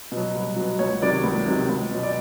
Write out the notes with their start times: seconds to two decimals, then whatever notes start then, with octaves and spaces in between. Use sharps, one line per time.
0.12 B2
0.17 F#3
0.35 C2
0.56 B2 F#3
0.79 C#2 C#5
1.02 C3 D#3 F#3 D5
1.24 C#2
1.46 C3 D#3 F#3
1.69 C#2
1.91 B2 F#3
2.03 D5